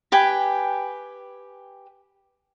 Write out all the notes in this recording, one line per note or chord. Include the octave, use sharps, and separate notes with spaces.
G4 B4 G5 G#5